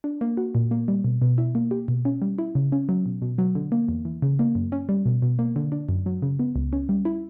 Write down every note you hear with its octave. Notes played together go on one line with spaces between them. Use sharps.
D4
A#3
F#4
A#2
A#3
G3
B2
B2
E4
A#3
G4
B2
C#4
G3
E4
C#3
C#4
F#3
B2
B2
F#3
D3
A#3
E2
E3
C#3
A#3
F#2
C#4
G3
B2
B2
A#3
D3
D4
F#2
F#3
C#3
B3
C#2
C#4
G3
E4